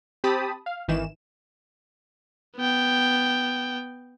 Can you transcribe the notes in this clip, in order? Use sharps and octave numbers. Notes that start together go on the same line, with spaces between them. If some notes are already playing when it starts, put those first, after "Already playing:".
C4 G4 A5 B5 D#6
F5
G#1 D#3 E3 E7
B3 G5